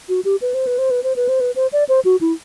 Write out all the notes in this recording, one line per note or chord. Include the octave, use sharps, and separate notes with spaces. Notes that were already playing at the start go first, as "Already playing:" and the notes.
F#4
G4
B4
C5
B4
C5
B4
C5
B4
C5
B4
C5
D5
C5
F#4
E4